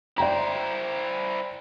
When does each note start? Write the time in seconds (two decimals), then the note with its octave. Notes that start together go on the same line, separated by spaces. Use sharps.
0.18 E4 C5 D5 G5 A#5